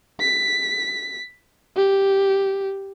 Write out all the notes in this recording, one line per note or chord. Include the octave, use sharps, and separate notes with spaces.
B6
G4